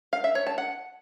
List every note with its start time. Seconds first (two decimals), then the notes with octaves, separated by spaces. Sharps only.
0.13 F5
0.24 E5
0.35 C#5
0.47 A5
0.58 F#5